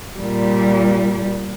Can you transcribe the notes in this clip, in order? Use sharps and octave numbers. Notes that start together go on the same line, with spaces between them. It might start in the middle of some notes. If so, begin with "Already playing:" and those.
A#2 G3